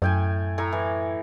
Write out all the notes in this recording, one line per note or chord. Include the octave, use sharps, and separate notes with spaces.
F#2 A2 G5 G#5
A2 G#5 A#5
E3